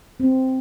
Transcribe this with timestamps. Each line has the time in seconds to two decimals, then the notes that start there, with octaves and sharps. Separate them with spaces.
0.20 C4